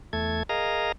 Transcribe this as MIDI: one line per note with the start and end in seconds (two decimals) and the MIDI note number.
0.13 0.43 40
0.13 0.43 57
0.13 0.43 69
0.13 0.43 92
0.49 0.92 68
0.49 0.92 70
0.49 0.92 75
0.49 0.92 77
0.49 0.92 82